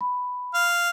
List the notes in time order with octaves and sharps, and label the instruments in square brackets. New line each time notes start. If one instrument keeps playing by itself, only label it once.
[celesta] B5
[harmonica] F5